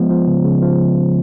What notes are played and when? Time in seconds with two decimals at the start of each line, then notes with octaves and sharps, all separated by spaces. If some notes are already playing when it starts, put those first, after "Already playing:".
Already playing: F3 G#3 B3
0.10 F3
0.27 C#3
0.44 C#3
0.62 F3